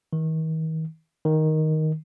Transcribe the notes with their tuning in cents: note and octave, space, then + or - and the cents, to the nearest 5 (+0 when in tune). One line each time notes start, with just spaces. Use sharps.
D#3 +40
D#3 +5